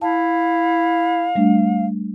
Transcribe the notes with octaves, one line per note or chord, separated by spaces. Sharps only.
E4 F5 A5
G3 A3 D4